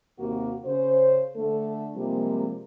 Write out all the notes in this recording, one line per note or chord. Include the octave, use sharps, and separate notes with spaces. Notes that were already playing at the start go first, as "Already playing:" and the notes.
D#2 C3 A#3 F#4
C#3 C5
D3 A3 A4
C3 F3 G3 G#3 A#3